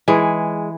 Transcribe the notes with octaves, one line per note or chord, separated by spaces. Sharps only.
E3 G#3